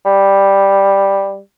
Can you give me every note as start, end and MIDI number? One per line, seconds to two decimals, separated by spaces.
0.05 1.39 55